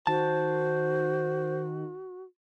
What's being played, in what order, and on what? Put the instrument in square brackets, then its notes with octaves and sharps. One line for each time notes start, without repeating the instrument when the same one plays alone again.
[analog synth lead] D#3 [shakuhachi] F#4 [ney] C5 [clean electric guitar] A5